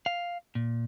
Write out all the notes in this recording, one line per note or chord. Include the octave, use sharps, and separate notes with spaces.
F5
A#2